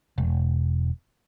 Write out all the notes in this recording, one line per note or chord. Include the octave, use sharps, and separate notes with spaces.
E1